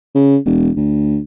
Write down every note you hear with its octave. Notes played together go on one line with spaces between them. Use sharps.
C#3
E1
D2